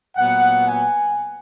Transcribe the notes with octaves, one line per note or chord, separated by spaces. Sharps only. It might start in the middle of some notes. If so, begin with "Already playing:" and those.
A#2 F#3 B3 F#5
G#5